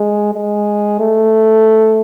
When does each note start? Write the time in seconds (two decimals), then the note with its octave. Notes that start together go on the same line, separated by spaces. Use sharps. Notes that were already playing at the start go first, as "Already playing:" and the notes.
Already playing: G#3
0.34 G#3
1.00 A3